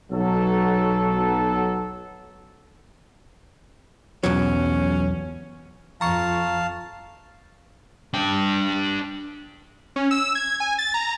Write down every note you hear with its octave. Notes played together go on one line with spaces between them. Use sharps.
B1 F#3 A4
B1 E2 F#3 C#4
F2 F5 A5 A#5 C#6
D4 G5
C#4
E6
G#6
G#5
A6
A#5